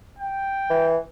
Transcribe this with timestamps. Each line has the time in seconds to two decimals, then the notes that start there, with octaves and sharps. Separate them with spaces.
0.18 G5
0.70 E3